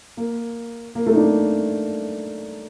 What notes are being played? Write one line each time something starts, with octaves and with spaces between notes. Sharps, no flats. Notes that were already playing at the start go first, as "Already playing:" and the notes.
A#3
A#3
A3
D#4
D4